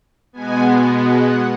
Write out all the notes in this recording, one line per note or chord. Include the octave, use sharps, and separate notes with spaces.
B2 G#3 B3 G#5
F#5